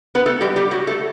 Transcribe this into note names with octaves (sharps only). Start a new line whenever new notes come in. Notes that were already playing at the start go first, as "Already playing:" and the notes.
B3 B4
A3 A4
G3 G4
G3 G4
F#3 F#4
A3 A4